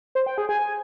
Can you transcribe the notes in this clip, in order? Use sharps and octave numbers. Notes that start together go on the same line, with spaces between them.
C5
G5
G#4
G#5